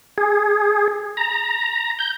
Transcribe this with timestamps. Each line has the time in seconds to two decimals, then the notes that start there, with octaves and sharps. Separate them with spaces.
0.18 G#4
1.17 A#5
1.99 G6